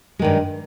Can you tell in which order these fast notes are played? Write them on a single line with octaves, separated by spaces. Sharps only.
G#3 D#3 G2